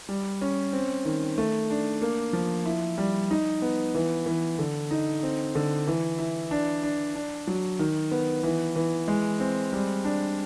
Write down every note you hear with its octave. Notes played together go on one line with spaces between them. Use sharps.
G3
C#4
C4
D#3
A3
D4
A#3
F3
E4
G3
D#4
B3
E3
E3
D3
D#4
C4
D3
E3
E4
D4
D4
D4
F#3
D#3
B3
E3
E3
G#3
C4
G3
D4